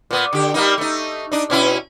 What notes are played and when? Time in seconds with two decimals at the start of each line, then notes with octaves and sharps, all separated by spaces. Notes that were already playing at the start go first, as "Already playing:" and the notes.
0.11 A#2 B3
0.33 D3 G4
0.54 G3 A#3 D#4
0.78 A3 D#4
1.32 D4 D#4
1.50 B2 C#4 E4